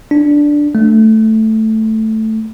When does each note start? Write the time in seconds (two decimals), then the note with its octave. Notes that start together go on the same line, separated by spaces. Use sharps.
0.11 D4
0.75 A3